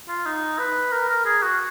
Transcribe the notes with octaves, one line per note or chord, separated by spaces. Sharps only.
F4
D#4
B4
A#4
A#4
G#4
F#4